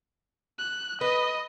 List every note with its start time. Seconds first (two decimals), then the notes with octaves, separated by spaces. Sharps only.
0.59 F#6
1.01 B4 D#5